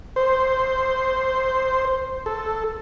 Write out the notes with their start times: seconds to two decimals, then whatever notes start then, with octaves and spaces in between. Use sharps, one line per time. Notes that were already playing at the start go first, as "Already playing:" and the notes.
0.16 C5
2.26 A4